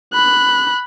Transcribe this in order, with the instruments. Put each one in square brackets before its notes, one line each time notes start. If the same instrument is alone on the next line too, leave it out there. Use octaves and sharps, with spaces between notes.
[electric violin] B5 F#6